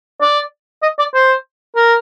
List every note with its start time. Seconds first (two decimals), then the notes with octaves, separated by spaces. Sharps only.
0.22 D5
0.83 D#5
0.99 D5
1.14 C5
1.76 A#4